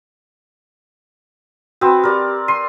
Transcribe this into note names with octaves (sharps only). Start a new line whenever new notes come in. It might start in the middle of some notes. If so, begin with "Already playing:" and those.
B3 C4 F#4
G4 A#4 D5
C6 D#7